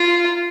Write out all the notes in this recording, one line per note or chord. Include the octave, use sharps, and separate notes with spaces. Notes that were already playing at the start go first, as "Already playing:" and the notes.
Already playing: F4